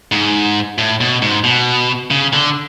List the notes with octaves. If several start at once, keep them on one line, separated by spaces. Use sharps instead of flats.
G#2
A2
B2
G#2
B2
C#3
D3